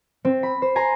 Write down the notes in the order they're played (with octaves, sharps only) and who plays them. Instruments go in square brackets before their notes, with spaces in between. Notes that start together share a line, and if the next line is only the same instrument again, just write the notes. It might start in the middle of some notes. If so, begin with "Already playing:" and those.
[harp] C4
B5
C5
G#5 A#5 C6